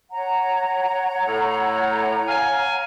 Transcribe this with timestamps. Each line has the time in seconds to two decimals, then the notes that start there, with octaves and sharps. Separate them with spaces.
0.11 C#5 F#5 A#5
1.27 A2
2.28 F5 G#5